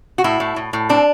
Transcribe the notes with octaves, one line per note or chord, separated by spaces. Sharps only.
F#4
A2 E4
A2
A2
A2
C4 D4